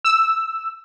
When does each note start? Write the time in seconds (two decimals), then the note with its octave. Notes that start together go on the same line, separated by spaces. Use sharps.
0.05 E6